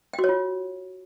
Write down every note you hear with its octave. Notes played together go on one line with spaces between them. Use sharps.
G5
F#4
C#5
F4